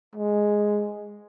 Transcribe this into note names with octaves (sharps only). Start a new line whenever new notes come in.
G#3